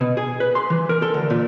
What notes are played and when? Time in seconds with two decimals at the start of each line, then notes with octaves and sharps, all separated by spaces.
0.01 B2
0.17 G#4
0.40 B4
0.55 C6
0.70 E3
0.89 A#4
1.02 A4
1.14 D2
1.30 A#2